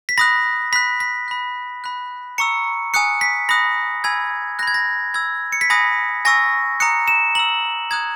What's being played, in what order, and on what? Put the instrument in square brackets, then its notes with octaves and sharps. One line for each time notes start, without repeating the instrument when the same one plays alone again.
[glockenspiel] B6
B5 D#6 F#6 A#6
B5 F#6 B6
B6
B5 F#6
B5 F#6
A#5 C#6 E6 C#7
G#5 D#6 F#6 C#7
B6
B5 D#6 F#6 A#6
G#5 B5 E6 G#6
F#6 A#6
B5 G#6
A#6
B5 E6 G#6
C#7
B6
G#5 B5 D#6 F#6 A#6
G#5 C#6 E6 A#6
A#5 D#6 F#6 C#7
E7
A#5 E6 F#7
A#5 D#6 F#6 G#6